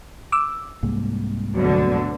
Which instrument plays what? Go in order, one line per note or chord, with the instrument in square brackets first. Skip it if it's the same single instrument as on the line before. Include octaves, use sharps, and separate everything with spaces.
[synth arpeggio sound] D6 E6
[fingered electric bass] C2 G#2 A#3
[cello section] D2 B2 D3 [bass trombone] F#3